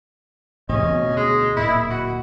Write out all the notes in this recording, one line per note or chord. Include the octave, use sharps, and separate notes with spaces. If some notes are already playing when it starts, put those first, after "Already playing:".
E2 A2 C3 C#4 D#5
D2 B2
G#3
D1 A#2 E4
F#4